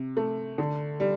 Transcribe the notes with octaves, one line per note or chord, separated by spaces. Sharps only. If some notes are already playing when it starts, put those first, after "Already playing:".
Already playing: C3
A3
D3
G3